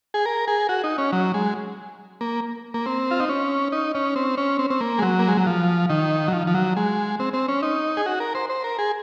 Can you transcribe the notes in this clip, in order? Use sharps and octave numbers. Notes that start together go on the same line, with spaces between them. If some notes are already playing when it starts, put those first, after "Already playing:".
G#4
A#4
G#4
F#4
D#4
C#4
F#3
G#3
A#3
A#3
C4
F4
D#4
C#4
D#4
C#4
C4
C#4
C4
C4
A#3
G#3
F#3
A#3
G#3
F#3
F3
D#3
F#3
F3
F3
F#3
G#3
C4
C4
C#4
D#4
G#4
F#4
A#4
C5
C5
A#4
G#4